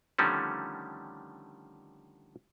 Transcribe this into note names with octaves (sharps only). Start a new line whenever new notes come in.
D3 D#3 F3 G3 A3 C#4